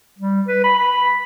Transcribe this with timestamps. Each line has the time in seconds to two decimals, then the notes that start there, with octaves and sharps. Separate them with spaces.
0.19 G3
0.48 B4
0.64 B5
0.79 B5